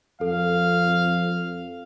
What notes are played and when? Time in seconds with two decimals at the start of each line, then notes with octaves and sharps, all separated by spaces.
0.21 F2 A4 F5